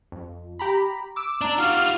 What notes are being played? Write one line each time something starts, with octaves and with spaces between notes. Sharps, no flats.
F2
G4 A#5 B5
D6 E6
D4 A#5
F4 F#4 F6